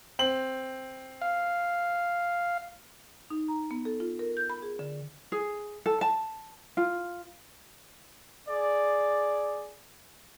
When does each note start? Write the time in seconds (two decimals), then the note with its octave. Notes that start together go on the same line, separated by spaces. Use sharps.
0.19 C4 F#7
1.22 F5
3.30 D#4
3.48 A#5
3.71 B3
3.85 A4
4.00 F4
4.19 A#4
4.37 G6
4.50 B5
4.62 G#4
4.79 D3
5.32 G#4
5.86 A4
6.01 A5
6.77 F4
8.48 G#4 D5